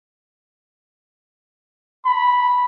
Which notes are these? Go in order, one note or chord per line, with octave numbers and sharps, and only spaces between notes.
B5